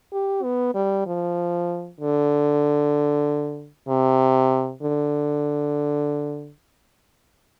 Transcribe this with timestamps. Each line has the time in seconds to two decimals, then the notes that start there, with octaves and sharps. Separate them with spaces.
0.13 G4
0.43 B3
0.75 G3
1.07 F3
2.00 D3
3.89 C3
4.82 D3